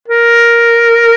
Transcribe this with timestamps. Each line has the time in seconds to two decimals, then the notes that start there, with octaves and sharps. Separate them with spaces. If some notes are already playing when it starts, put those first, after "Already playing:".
0.08 A#4